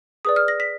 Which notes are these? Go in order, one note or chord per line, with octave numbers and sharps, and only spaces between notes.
G#4 B4 D5 D#6
F6
A#6
B6